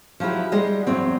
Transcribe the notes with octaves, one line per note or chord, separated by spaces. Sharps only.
F3 F#3 G#3 E4 G4
G3 G#3 G#4 D#5
E2 G2 F#3 C4